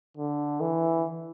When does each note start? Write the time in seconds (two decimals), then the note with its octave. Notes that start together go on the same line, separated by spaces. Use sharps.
0.17 D3
0.61 E3